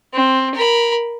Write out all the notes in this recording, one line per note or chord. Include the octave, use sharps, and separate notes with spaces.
C4
A#4 B5